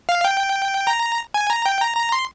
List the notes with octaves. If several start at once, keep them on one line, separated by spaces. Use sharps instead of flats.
F5
G5
A#5
G#5
A#5
G5
A#5
A#5
C6